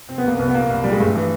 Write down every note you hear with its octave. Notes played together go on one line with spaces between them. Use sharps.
C3 C4
B3
C2 A#3
C2 B3
B3
A#2 A#3
C2
A#2 G3
G#3
G2 A3
E3